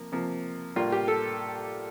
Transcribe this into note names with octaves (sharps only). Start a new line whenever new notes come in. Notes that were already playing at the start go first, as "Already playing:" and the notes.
Already playing: C3 F3 A#3
C3 F3 A#3
A2 G3 A#3 D4 F4
G4
A4